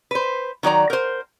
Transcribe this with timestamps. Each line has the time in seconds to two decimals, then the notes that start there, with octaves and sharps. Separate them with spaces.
0.11 B4 C5
0.63 D#3 F#3 D5 A#5
0.90 A#4 C5